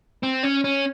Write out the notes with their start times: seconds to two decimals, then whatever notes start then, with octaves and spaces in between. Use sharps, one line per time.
0.23 C4
0.43 C#4
0.64 C#4